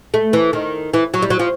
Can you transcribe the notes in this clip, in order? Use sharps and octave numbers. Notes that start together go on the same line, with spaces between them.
A3
E3
D#3
E3
F#3
G3
F#3
F3